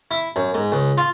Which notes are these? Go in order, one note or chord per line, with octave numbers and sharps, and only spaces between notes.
E4
F#2
G#2
C#2
F4